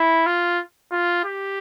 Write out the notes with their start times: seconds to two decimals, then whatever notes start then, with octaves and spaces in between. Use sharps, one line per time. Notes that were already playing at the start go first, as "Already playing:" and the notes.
Already playing: E4
0.26 F4
0.92 F4
1.25 G4